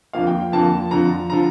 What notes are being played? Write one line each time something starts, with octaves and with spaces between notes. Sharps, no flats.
F2 D3 F3 A#3 F5
G5
G5
F2 D3 F3 A#3 A5
F2 D3 F3 A#5
D3 F3 A#5